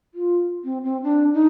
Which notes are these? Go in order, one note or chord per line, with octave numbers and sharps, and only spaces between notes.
F4
C4
C4
D4
D#4